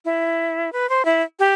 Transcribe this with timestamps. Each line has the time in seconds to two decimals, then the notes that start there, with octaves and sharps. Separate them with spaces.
0.05 E4
0.73 B4
0.89 C5
1.05 E4
1.39 G4